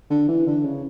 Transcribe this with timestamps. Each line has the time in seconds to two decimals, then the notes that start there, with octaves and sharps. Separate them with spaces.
0.10 D3
0.29 E3
0.47 D3
0.65 C#3